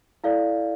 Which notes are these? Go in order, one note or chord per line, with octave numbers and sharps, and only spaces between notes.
E4 A4 D5 F5